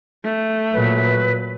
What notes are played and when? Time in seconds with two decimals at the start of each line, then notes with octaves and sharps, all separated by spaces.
0.24 A3
0.73 A#2 F#3 B4